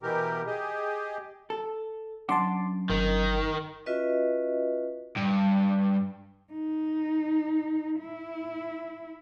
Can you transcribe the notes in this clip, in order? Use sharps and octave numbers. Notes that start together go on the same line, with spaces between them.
B2 E3 G4 A#4
G4 G#4 D#5
A4
F#2 D4 F#5 A5 C6 D6
G1 D#3
C#4 F4 F#4 B4 D#5 E5
G2
D#4
E4